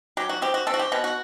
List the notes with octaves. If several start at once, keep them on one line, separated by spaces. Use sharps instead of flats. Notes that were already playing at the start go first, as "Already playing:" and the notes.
F#3 G4
F#4
C4 G4
F#4
C4 A4
F#4
G4
B2 F#4
F#4